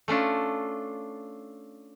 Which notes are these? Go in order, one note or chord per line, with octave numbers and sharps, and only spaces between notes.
A3 C#4 D4 F4